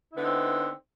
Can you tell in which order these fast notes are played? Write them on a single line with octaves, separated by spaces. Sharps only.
E4 D3 B3 D#4 C4